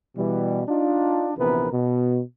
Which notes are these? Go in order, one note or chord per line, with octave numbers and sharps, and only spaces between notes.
B2 E3 G3
D4 D#4 F4
A#1 C3 E3 B3 A#4 B4
B2